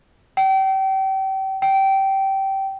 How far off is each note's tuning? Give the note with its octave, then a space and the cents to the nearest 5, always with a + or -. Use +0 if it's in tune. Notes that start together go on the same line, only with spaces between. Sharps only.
G5 -35
G5 -20